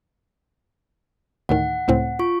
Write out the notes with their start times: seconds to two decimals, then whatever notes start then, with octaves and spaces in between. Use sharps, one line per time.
1.49 D2 A2 D#3 F#5
1.88 C#2 A2 C4
2.19 F4 C#6